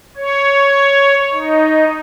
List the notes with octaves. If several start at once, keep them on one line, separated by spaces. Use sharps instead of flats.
C#5
D#4